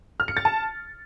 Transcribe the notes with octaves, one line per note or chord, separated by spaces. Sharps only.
F6
C#7
A6
A5